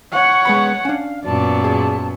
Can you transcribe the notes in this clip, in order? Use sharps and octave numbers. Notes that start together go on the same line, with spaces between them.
C#5 F#5 C#6
G#3 B3 B5
C#4 D4 F5
F#2 A#2 B3 D5 A5
G#4